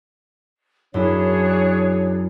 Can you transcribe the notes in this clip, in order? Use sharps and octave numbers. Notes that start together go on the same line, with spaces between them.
F#2 D4 E4 G#4 C#5